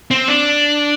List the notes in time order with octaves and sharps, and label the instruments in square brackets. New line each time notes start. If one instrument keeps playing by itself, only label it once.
[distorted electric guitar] C4
D4